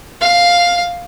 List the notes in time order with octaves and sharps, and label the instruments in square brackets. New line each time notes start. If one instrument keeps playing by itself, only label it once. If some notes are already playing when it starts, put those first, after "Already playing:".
[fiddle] F5